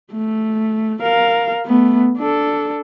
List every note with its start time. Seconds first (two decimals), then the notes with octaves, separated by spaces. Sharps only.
0.12 A3
1.02 A#4 F5
1.66 A3 B3
2.17 D4 A4